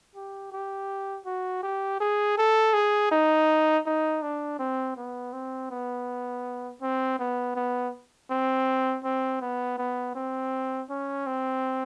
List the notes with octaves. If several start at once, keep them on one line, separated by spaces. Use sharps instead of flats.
G4
G4
F#4
G4
G#4
A4
G#4
D#4
D#4
D4
C4
B3
C4
B3
C4
B3
B3
C4
C4
B3
B3
C4
C#4
C4